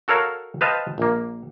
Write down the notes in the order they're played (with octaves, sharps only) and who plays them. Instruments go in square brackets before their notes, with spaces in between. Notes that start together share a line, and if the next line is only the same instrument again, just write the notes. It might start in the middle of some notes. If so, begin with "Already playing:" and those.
[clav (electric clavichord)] F#4 A4 A#4 C#5 F5
B4 C5 D#5 F5 G5 A5
A#1 A#3